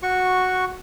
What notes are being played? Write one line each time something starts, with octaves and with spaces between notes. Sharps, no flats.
F#4 C#6